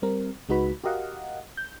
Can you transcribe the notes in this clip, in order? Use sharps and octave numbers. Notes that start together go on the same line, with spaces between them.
G3 C4 A#4
C#2 G#3 D#4 F#4 B4 B5
F#4 G4 A#4 D#5 F5 F#5
G6